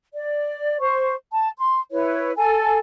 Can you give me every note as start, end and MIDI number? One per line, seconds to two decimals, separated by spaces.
0.13 0.80 74
0.81 1.14 72
0.81 1.14 85
1.32 1.49 81
1.59 1.79 84
1.92 2.32 64
1.92 2.32 71
1.92 2.32 73
2.37 2.78 69
2.37 2.78 80